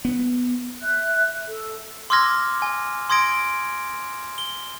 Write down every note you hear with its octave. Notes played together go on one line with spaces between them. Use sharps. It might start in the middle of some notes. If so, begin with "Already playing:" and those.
B3
E5 F#6
A4
C6 D6 E6 F6 G#6 A#6
G#5
C6 D#6 G#6 A#6 D7
G7